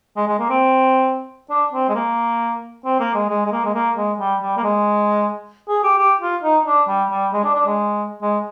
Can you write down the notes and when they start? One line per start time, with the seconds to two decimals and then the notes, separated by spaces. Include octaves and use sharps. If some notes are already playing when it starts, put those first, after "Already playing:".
0.17 G#3
0.27 G#3
0.39 A#3
0.50 C4
1.50 D4
1.73 C4
1.89 G#3
1.95 A#3
2.85 C4
3.00 A#3
3.15 G#3
3.29 G#3
3.46 G#3
3.52 A#3
3.65 G#3
3.75 A#3
3.97 G#3
4.19 G3
4.42 G3
4.58 A#3
4.64 G#3
5.69 G#4
5.84 G4
5.99 G4
6.21 F4
6.43 D#4
6.66 D4
6.88 G3
7.11 G3
7.33 G#3
7.44 D4
7.55 D4
7.66 G#3
8.22 G#3